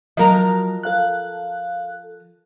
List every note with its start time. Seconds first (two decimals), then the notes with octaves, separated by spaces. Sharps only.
0.17 F3 F#3 A#4 D#5 A#5
0.83 A4 F5 F#6